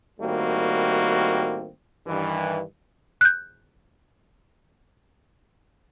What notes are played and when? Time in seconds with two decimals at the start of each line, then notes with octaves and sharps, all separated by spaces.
0.20 A2 D#3 G3 A#3 C4 F#4
2.06 G2 D#3 E3
3.21 F#6 G6